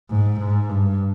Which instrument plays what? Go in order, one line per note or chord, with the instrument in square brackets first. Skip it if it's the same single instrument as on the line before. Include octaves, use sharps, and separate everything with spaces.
[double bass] G#2
G#2
G2